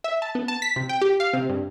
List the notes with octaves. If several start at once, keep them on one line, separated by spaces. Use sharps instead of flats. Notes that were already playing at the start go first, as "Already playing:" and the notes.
E5
A5
B3
A5
B6
C3
G5
G4
F5
C3
G2